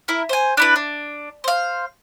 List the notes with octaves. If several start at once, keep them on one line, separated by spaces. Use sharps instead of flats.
E4 A#4
C5 G#5
D4 E4 B4
D4
C5 F5